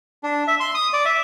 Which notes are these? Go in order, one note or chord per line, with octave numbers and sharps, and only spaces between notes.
D4
E5
C6
D#6
D5
E5